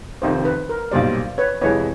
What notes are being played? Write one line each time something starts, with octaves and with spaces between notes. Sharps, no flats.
F1 F2 C3 D#3 C5
B4
A#4
B1 A#2 G3 C5 D5
B4 C#5
F2 C3 E3 G#3 B4 C#5